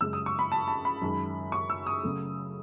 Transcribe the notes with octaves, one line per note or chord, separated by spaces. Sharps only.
F#2 C#3 G#3 E6
D#6
C#6
B5
A5
A5
B5
F#2 D#3 G#3
C#6
E6
D#6
C#3 F#3 A3